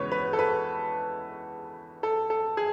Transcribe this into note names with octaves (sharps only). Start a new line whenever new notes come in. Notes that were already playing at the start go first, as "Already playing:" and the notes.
Already playing: E2 C#3 G#3 B4 C#5
B4
A4
B4
A4
A4
G#4